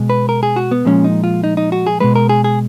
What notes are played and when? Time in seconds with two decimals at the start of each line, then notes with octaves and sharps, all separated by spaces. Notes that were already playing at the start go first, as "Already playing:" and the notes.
Already playing: B2 G#3
0.10 B4
0.29 A#4
0.43 G#4
0.56 F#4
0.71 B3
0.85 A#2 F3 G#3 C#4
1.04 D#4
1.24 F4
1.44 D#4
1.57 D#4
1.72 F#4
1.87 G#4
2.00 B2 G#3 B4
2.16 A#4
2.29 G#4
2.44 G#4